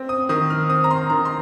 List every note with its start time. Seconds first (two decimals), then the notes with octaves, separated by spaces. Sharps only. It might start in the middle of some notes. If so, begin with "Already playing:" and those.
Already playing: C4
0.09 D#6
0.29 D#3 D#6
0.50 F6
0.69 C4 D#6
0.84 A#5
0.90 C6
1.10 D#3 A#5
1.25 C6